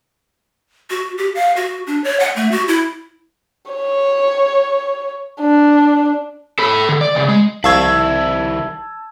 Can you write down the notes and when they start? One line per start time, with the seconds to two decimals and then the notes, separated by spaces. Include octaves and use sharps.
0.90 F#4
1.18 G4
1.35 F5
1.56 F#4
1.87 D4
2.04 C#5
2.20 F#5
2.36 A3
2.51 F#4
2.68 E4
3.71 C#5
5.41 D4
6.59 A4 B5
6.89 D3
7.01 D5
7.15 C#2 C#3
7.29 G#3
7.64 C2 D#3 E4 F5 A5 C#6 E6 G#6